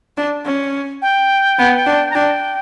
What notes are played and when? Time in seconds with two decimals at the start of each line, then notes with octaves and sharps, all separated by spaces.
0.17 D4
0.45 C#4
1.02 G5
1.58 B3
1.86 D4
2.11 A#5
2.15 D4 G5